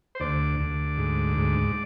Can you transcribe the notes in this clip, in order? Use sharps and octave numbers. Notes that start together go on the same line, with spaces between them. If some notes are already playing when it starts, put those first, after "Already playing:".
C5
D2 D5
D2
G#2
G#2